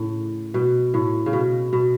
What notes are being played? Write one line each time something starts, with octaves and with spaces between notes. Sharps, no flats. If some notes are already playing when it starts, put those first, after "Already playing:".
Already playing: A2 C#3
B2
A2
C#3
B2
B2